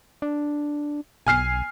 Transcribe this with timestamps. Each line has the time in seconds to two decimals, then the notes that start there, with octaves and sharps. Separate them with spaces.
0.22 D4
1.27 B1 G#5 F6 C7